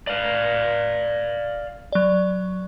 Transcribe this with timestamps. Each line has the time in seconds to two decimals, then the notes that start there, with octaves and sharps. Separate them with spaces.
0.07 D5 F5
1.92 F#3 D5